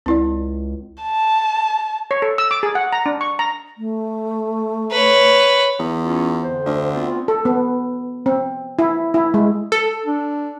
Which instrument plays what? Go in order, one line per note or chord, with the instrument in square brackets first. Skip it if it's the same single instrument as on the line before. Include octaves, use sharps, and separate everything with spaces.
[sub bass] C#2 [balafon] C4 E4 D5
[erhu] A5
[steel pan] C#5
A4
E6
D6
G#4
F#5
A#5
D4
C#6
A#5
[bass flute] A3
[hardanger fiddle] B4 C#5
[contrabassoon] E2
[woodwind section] C#4 F4
F2 D3 C5
[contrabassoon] D2
[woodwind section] B3 C4 F4
[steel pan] A4
B3
C4
E4
E4
G#3
[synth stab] A4
[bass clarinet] D4